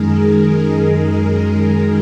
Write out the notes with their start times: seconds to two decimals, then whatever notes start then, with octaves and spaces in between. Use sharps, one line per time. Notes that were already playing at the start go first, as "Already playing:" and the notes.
Already playing: F#2 D#3 G#3 G#4 A#4
0.63 G#4
0.94 G#4